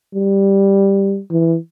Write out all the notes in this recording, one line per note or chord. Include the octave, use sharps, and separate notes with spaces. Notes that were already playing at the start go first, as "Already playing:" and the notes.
G3
E3